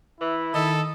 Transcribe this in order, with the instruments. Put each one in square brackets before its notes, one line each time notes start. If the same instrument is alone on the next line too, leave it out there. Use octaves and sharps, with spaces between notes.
[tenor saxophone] E3 [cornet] E4
[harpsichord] D#3 [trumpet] A4 [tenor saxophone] D#5